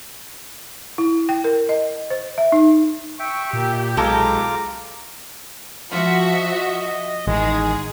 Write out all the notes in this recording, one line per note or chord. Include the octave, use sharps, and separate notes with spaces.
E4
G5
A#4
D#5
C5
E5
D#4
E5 G5 C#6
A#2 G4
B1 G#3 F4 A4 A#5 D6
F3 F4 F#4 E5
D#5
A1 D#3 G#3 G#4